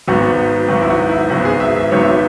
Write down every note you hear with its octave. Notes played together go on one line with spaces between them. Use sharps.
G#1 G#2 F#3 B3 F#4
G#1 G#2 F#3 B3 F#4
E4
F#4
E4
G#1 G#2 F#3 B3 F#4
G#4
E5
E5
G#1 G#2 F#3 B3 C#5
E5